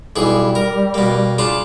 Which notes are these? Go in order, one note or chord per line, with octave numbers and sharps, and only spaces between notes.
B1 E3 G3 G#4
A#4
B2 A#3
C#3 D4 F4